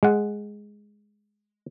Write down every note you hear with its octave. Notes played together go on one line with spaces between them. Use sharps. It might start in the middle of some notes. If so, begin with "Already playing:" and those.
G#3 F#5